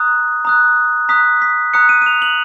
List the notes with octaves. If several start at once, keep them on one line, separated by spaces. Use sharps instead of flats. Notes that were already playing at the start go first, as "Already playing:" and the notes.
Already playing: A#5 D#6 F#6
A#5 D#6 F#6
A#5 D#6 F#6 B6
B6
A#5 D#6 F#6 C#7
D#7
D#7
F7
F#7